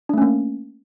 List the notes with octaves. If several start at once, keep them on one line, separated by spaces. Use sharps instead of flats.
A3 A#3 C#4 D4